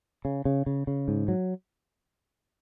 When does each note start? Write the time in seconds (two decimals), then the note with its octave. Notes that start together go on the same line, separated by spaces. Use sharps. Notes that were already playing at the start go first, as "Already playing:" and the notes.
0.25 C#3
0.45 C#3
0.66 C#3
0.87 C#3
1.08 G#2
1.28 F#3